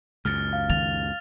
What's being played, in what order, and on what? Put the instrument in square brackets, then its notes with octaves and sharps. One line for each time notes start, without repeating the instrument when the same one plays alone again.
[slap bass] C#2 F#2 [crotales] F6 A6
[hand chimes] F5
[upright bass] D#3 [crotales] A6 F7